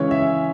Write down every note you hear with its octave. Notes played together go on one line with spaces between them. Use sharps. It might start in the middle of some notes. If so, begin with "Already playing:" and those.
Already playing: C#3 E3 G#3 C#4 C#5
E5